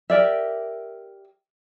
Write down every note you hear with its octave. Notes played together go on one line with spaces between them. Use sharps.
G4 A#4 D5 E5